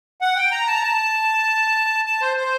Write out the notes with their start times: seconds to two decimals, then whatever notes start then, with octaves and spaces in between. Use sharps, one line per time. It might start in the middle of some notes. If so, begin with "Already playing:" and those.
0.21 F#5
0.36 G5
0.52 A#5
0.67 A5
0.75 A#5
0.83 A5
2.06 A5
2.21 C5
2.37 C5